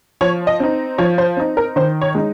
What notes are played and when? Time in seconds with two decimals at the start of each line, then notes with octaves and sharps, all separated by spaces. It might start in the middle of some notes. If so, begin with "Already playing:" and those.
0.21 F3 C#5
0.47 D#5
0.60 C4 D#4
0.98 F3 C#5
1.18 C5
1.37 C4 D#4
1.57 A#4
1.76 D#3 C5
2.02 C#5
2.15 G#3 D#4